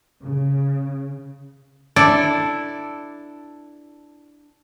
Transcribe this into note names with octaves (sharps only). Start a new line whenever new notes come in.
C#3
D4 E4 A4 D5